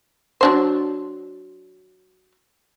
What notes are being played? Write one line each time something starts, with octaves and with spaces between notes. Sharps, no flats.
F#3 D4 C5